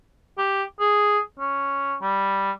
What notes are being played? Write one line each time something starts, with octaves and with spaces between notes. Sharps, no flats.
G4
G#4
C#4
G3